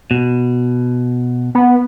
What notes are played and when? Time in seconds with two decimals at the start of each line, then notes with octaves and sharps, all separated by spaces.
0.11 B2
1.55 B3